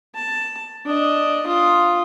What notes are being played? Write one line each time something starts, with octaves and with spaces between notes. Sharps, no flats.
A5
D4 D#5
F4 D#6